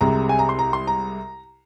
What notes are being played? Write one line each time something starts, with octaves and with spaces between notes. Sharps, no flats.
C2 C3 G#3 A#5
G#5
A#5
C6
A#5
C6
A#5